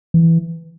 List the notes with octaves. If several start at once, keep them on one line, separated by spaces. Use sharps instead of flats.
E3